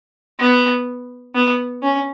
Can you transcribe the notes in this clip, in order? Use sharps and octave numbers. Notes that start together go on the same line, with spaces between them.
B3
B3
C#4